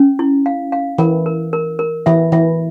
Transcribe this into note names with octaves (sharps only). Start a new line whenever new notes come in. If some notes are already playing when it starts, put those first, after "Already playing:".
Already playing: C#4
E4
F5
F5
E3 A#4
A#4
A#4
A#4
E3 E5
E3 E5